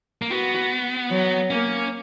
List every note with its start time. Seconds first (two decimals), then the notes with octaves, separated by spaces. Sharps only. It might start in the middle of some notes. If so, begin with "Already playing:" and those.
0.22 A#3
0.31 B3 F#4
1.11 F#3
1.50 A#3 C#4